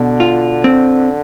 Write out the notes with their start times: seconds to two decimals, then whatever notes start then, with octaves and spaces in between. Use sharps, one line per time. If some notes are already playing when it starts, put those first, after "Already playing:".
Already playing: B2 D3
0.20 F4
0.64 C4